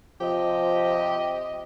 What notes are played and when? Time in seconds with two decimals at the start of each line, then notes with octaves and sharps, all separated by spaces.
0.21 C3 F3 G4 D#5